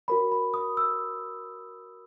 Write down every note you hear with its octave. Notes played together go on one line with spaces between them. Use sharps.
F#4 A#4 C#5 B5
B5
D#6
E6